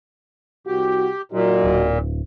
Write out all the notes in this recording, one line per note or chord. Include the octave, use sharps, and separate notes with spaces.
C2 F#4 G4
A#2 F#3 D#4 F#4
D1